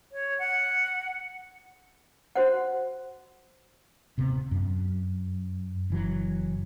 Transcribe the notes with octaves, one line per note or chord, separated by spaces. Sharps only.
C#5
F#5
F#4 C5 F#5
D#1 C3 B3
F#2
F#1 E3 F#3